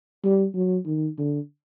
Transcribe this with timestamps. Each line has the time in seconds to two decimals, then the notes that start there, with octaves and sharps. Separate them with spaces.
0.24 G3
0.55 F#3
0.86 D#3
1.18 D3